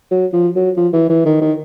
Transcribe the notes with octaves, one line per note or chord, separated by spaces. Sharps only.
F#3
F3
F#3
F3
E3
E3
D#3
D#3